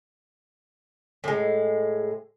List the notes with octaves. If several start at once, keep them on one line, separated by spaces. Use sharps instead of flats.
A2 G#3